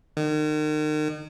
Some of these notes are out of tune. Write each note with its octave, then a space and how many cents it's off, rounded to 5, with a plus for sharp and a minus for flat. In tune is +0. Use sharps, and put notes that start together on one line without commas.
D#3 -35